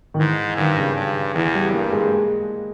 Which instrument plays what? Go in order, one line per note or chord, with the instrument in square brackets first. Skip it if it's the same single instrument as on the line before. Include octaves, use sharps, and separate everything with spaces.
[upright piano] D#3
[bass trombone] G#2 [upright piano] E3
[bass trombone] G2 [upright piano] D#3
[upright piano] C#3
[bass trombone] G2
[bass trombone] E2 [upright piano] E3
[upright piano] G3
[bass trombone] G2 [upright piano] A#3
[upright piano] G#3